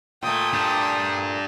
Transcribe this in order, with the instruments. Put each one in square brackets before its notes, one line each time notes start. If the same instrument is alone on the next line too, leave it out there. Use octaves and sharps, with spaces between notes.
[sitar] A#2 A3 [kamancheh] G5 D#6
[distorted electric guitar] D4 G4